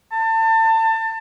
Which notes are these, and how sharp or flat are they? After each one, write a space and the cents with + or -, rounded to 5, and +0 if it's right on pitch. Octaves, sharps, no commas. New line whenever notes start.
A5 +30